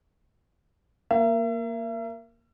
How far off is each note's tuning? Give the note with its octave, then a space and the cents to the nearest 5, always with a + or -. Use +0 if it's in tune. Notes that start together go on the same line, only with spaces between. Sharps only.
A#3 +0 E5 +40